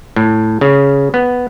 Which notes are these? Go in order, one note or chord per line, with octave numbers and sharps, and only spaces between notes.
A2
C#3
B3